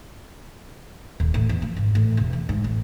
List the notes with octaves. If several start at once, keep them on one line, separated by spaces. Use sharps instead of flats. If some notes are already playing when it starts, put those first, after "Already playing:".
D#1
A1
E2
F3
G#1
A1
E1
E2
G#2
A1